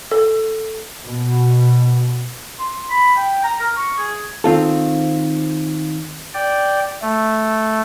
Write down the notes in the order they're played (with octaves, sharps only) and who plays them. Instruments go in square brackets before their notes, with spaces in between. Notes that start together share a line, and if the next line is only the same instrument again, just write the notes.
[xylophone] A4
[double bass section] B2
[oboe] C6
B5
G5
A#5
A#4
C#6
G#4
[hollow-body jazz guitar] D#3 C4 F4 A4
[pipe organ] D5 G5
A3